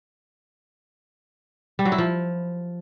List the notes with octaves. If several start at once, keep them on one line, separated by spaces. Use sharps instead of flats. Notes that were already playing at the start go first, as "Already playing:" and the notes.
G3
F#3
E4
F3